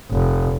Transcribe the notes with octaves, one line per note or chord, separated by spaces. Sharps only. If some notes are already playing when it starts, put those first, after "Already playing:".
F1